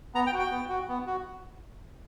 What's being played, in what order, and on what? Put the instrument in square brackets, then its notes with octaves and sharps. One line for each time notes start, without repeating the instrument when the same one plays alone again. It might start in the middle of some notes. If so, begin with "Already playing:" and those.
[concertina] B3 A#5
G5
F#4
G5
B3
F#4
B3
F#4